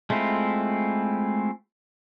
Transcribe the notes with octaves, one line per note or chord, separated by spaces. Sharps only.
G#3 A3 C4 E4 F4